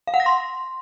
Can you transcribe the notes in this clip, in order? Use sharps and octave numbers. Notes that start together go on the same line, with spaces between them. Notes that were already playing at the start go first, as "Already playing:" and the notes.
F5
F#5
A#6
C6